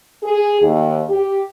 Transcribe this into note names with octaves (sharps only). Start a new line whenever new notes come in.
G#4
D#2
G4